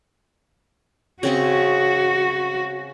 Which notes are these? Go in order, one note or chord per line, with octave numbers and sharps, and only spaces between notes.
C#3 C4 F#4 D#5